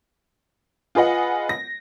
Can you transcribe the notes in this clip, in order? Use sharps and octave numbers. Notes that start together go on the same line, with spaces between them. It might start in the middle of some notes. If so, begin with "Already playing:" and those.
F4 G#4 B4 D#5 F#5
A#6